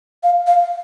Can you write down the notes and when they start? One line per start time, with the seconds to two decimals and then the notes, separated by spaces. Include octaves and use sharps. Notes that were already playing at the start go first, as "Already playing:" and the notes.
0.23 F5
0.47 F5